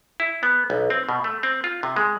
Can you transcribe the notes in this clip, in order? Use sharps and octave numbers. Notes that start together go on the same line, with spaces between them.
E4
B3
B1
C4
B2
A3
C4
F4
C3
G#3